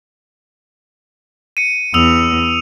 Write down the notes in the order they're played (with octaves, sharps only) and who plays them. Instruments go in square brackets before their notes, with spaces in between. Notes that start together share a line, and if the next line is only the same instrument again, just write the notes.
[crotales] C#7 D#7
[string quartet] E2 [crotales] D#6 E6 F7